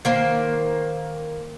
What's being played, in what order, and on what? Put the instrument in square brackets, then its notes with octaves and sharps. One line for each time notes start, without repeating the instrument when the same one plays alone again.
[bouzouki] D#3 A#3 C5